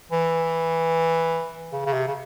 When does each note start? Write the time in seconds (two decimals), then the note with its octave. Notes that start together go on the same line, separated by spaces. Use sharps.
0.11 E3
1.72 C#3
1.86 C#3
1.93 C3
2.07 C#3